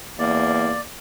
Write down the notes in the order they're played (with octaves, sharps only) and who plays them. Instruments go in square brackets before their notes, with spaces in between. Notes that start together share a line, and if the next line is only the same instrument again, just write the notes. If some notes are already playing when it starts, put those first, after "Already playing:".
[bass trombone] E2 [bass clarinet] A#3 [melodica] D5